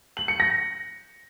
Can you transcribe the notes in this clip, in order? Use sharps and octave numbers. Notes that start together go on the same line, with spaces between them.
F#7
C#7
A#6